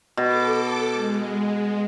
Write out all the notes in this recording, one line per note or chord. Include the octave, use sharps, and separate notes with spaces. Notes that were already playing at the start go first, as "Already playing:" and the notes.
B2 A4 D6
G#3